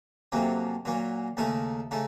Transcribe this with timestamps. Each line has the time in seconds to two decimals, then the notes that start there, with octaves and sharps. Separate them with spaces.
0.32 F2 C3 F#3 A#3 C#4
0.85 A#2 F#3 A#3 C#4
1.37 D#2 C#3 A3 D#4 A#4
1.91 C#3 A3 D#4